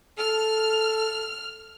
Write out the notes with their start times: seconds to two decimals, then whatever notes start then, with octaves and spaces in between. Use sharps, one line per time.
0.18 A4 F6